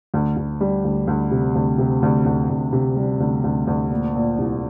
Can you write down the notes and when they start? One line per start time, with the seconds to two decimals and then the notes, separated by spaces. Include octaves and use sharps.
0.14 D2
0.37 D2
0.61 G3
0.85 D2
1.07 D2
1.31 C3
1.55 D2
1.78 C3
2.03 D2
2.26 D2
2.49 D2
2.73 C3
2.96 G3
3.20 D2
3.44 D2
3.67 D2
3.90 A#2
4.15 A#2
4.38 C2